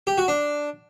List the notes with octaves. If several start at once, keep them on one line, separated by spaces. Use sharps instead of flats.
G4
F#4
D4